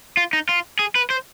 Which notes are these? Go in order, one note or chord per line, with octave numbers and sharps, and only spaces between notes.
F4
D#4
F4
G#4
B4
C5